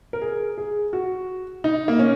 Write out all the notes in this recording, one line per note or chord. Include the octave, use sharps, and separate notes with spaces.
A#4
G#4
G#4
F#4
D#4
A#3
C#4